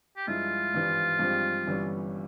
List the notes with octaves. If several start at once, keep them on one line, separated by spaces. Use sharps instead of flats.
G4
G2 F3 G#3 E4 F4
G#1 G2 E3 G3
G2 F3 G#3 C4 G4
G1 G2 E3 G3 C#4